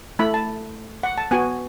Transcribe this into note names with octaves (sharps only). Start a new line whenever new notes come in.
A3 E4 B5
A5
F#5
A5
B3 F#4 G#5